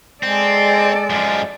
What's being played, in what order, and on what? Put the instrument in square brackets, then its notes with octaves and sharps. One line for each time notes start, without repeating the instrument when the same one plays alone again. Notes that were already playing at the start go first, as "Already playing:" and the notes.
[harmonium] G#3 [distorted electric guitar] C4 [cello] A4 D5
[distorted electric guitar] F#2 F3